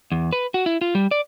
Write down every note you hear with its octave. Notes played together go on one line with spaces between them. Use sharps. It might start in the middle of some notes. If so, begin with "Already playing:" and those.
E2
B4
F#4
E4
F4
G3
D5